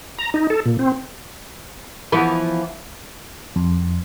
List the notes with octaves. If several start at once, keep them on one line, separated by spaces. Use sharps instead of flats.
A#5
D#4
A4
A#2
C4
E3 F3 B3
F2